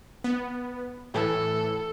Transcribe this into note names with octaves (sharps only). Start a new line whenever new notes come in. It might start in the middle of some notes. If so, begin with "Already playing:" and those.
B3
A2 E3 A4